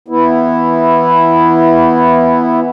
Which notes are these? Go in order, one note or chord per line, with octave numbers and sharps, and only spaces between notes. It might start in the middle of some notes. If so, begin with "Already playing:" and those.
E3 B3 E4